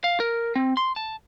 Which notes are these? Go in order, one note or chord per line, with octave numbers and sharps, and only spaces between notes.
F5
A#4
C4
C6
A5